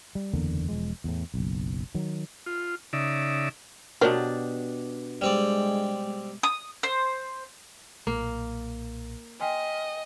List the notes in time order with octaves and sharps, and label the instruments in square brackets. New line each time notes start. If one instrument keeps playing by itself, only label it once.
[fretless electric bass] G3
F#1 E2 D3 A#3
E1 F3 G#3
E2 A2
F#1 B1
D#3 F#3
[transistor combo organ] F4
C#3 D#4 D5 E5
[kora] B2 D4 G4 [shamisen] F#3 A#4 C5
[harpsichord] G3 C4 D5 [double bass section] G#3
[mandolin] D#6
C5
[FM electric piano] B1 A#2 [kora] A#3
[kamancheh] D#5 [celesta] G5 G#5 [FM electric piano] C6 F6 B6